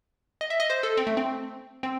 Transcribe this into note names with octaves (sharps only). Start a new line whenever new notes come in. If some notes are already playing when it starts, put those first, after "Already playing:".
D#5
E5
D#5
C5
A4
C4
A3
C4
C4